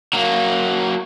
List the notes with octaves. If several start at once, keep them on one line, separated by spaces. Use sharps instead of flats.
F#3 A#3